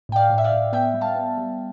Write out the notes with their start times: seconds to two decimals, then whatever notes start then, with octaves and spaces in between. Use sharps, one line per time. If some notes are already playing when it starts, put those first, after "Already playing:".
0.09 A2 G5
0.16 D5 F5
0.30 A2
0.38 E5
0.44 D5 F5
0.52 A2
0.73 B3 E5 G5
0.94 G3
1.01 F5 A5
1.15 B3
1.37 G3